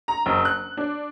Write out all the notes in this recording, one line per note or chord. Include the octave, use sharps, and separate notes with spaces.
A#5
F#1
F#6
D4